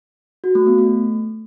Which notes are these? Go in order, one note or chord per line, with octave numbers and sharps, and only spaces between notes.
F#4
A3
B3
A3